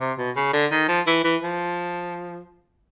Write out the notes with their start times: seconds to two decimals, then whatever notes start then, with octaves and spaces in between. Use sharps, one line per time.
0.01 C3
0.18 B2
0.36 C#3
0.53 D3
0.72 D#3
0.88 F3
1.07 E3
1.24 E3
1.41 F3